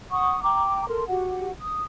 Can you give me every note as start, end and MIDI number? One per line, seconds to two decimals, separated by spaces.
0.10 0.42 78
0.10 0.42 85
0.10 0.42 87
0.42 0.86 79
0.42 0.86 82
0.42 0.86 86
0.88 1.05 69
0.88 1.05 70
0.88 1.05 84
1.08 1.50 66
1.08 1.50 67
1.08 1.50 78
1.61 1.83 87